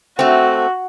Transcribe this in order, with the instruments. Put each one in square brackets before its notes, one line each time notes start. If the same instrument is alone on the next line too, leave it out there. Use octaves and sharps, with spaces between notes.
[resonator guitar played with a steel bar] A3 C4 [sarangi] F#4